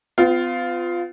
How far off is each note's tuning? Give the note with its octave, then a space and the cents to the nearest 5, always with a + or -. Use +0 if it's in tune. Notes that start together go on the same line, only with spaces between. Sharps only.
B3 +45 F4 +0